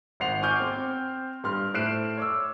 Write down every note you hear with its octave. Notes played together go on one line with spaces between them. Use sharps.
G#1 C5 F#5 C7 F7
G#5 C#6 D6 F6 G6 G#6
C4 C5
G2 C6 F6
A2 C5 F#6 C7 D7 E7
C#5 D6 E6